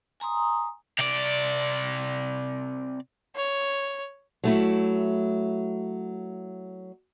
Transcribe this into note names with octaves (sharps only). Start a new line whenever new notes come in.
G#5 A#5 C6 D#6
C3 D5
C#5
F#3 A3 E4